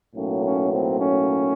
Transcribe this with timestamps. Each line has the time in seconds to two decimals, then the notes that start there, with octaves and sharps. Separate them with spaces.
0.14 B1 A2 F#3 A#3 C#4
0.43 C#4
0.72 C4
0.99 C#4